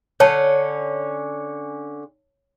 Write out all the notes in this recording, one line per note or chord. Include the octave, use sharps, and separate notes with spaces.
D3 C#4 C#5 A5